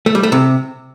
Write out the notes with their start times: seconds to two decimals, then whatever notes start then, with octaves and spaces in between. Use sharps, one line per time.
0.06 A3
0.15 G3
0.23 A3
0.32 C3